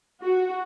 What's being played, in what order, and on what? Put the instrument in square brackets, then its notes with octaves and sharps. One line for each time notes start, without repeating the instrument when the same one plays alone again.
[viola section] F#4